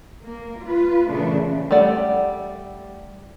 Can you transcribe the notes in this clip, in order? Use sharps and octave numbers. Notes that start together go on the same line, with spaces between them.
A#3
F4 B4
A#2 C#3 E3 A3 D4
G3 A3 D5 F#5